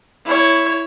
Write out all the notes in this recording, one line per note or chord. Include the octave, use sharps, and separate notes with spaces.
E4 C#5